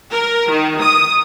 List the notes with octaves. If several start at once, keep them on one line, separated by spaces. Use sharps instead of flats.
A#4
D#3
D#6